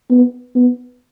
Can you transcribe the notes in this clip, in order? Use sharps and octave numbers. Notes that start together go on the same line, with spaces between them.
B3
B3